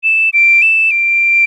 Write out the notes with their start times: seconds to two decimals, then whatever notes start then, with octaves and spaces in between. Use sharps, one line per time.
0.04 E7
0.33 D7
0.62 E7
0.91 D7